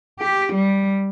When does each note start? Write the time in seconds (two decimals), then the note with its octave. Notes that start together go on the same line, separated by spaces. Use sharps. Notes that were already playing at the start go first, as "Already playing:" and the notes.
0.20 G4
0.54 G3